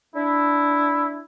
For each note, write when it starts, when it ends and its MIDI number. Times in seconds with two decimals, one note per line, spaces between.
0.15 1.21 62
0.15 1.21 64